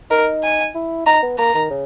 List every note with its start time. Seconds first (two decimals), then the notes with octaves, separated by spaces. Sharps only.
0.11 D#4 A#4
0.43 G#5
0.75 E4
1.06 D#4 A#5
1.23 B3
1.39 A#3 A#5
1.55 D#3
1.71 C#3